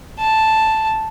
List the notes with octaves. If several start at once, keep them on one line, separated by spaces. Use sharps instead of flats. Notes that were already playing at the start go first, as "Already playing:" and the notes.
A5